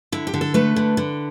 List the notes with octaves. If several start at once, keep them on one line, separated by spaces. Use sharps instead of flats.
D3 E4
G4
D3
A4
A3 B4
D3
D3